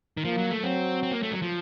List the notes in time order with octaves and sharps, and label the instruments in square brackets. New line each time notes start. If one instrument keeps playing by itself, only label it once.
[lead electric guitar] D#3
[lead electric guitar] F3 [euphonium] A#3
[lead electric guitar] F#3
A3
[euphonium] F#3 [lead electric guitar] C4
[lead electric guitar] C4
A#3
A3
F#3
F3